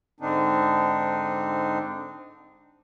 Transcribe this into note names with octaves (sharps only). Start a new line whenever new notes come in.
G#2 D3 C4 D4 D#4